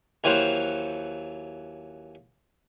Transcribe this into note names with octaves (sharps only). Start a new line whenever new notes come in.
D#2 E3 F#3 C5